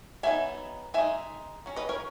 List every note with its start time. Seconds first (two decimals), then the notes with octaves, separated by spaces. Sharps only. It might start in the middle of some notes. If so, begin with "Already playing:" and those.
0.23 F#3 B3 D#4 E5 G#5
0.94 G#3 D#4 E5 G#5
1.66 F#3 C#4
1.76 B4 D#5
1.89 A#4 C#5